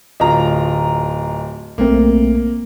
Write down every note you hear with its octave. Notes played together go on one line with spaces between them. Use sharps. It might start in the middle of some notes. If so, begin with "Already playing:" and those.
D1 F4 D#5 A#5
B1 A3 A#3 C4